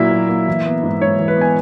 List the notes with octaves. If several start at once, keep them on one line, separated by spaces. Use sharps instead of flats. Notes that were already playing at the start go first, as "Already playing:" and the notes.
Already playing: A#2 F#3 A#3 E4 E5
F#3
A#3
E3
B3
G#2
G#2 C#5
E3
B4
B3 G#5